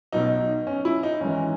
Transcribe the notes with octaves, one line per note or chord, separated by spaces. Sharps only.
B1 B2 F#3 D#4
C#4
E4
D#4
G#1 G#2 E3 C#4